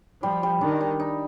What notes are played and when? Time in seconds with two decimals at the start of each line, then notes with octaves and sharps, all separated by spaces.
0.23 F3 G3
0.43 G3
0.61 D#3 D4
0.81 G3
1.00 D#4